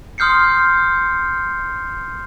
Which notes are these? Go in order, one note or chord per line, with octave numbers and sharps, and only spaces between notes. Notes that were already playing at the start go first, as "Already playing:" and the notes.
C6 D#6 F6 G6 C7 C#7